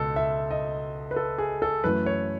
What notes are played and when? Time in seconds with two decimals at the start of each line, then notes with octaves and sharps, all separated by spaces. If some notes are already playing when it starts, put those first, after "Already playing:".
Already playing: C#2 B2 A4
0.16 E5
0.51 D#5
1.11 B4
1.16 A4
1.38 G#4
1.62 A4
1.84 F#2 E3 A3 B4
2.06 C#5